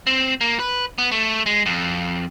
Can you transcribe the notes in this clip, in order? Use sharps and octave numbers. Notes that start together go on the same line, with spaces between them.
C4
A#3
B4
B3
A3
G#3
F2